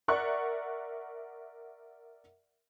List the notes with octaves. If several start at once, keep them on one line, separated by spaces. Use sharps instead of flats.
A#4 D5 E5 F#5 C#6 F#6